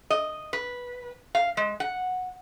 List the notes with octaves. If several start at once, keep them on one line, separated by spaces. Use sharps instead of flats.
D#5
B4
F5
G#3
F#5